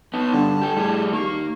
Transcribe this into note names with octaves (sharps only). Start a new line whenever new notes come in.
B3 D#4 A5
G2 D3
G4 A4
A2 G3 G#4
D#2 A#3 C#6